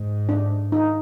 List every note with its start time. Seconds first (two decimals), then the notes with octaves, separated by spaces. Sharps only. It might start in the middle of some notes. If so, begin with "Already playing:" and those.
Already playing: G#2
0.29 D4
0.72 D#4